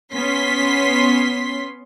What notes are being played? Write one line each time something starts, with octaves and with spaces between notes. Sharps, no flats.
B3 C#4 C6 B6